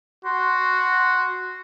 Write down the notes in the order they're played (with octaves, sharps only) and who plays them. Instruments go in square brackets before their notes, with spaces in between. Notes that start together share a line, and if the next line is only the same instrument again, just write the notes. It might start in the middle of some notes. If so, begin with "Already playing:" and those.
[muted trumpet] F#4 [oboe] C6